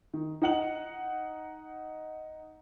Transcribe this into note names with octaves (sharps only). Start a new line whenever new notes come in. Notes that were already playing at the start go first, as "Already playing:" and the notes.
D#3
D#4 F#5 F#7